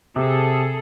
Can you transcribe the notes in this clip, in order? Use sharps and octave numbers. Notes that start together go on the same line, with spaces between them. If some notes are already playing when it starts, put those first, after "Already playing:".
C3 G#4 A4